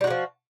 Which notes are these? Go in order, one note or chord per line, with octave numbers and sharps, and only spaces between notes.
F3 G3 G#3 F#4